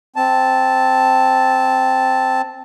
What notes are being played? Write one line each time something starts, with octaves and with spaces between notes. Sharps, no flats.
C4 A5